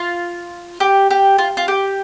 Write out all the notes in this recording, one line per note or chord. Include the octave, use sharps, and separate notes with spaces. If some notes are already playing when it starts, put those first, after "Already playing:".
Already playing: F4
G4
G4
F4
F4
G4